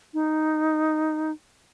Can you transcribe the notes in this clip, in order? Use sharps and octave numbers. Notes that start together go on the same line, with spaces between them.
D#4